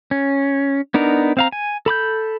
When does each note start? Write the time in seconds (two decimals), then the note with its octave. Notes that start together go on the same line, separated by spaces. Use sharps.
0.11 C#4
0.94 B3 D4 D#4 A#4
1.37 C4 F5 A#5
1.52 G#5
1.86 A4 B5 D6 G6